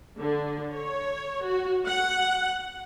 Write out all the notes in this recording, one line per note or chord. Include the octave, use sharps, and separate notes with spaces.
D3
C#5
F#4
F#5